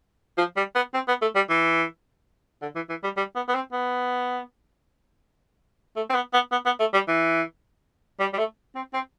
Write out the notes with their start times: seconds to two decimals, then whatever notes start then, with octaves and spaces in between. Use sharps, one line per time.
0.38 F3
0.57 G3
0.75 B3
0.94 C4
1.08 B3
1.22 A3
1.35 G3
1.50 E3
2.62 D3
2.75 E3
2.89 E3
3.03 G3
3.17 G3
3.36 B3
3.48 B3
3.55 C4
3.73 B3
5.96 A3
6.10 C4
6.15 B3
6.33 B3
6.52 B3
6.66 B3
6.80 A3
6.94 G3
7.08 E3
8.20 G3
8.34 G3
8.38 A3
8.75 C4
8.94 C4